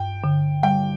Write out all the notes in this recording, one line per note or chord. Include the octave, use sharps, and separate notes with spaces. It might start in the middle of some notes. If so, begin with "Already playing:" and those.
Already playing: G2 G5
D3
G3 G5